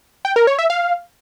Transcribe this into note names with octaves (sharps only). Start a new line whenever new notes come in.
G5
A#4
C#5
E5
F5